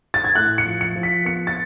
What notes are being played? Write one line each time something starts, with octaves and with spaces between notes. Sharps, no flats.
A6
G#6
A2 F#6
C#7
F3
C#7
F3
B6
B3 C#7
A6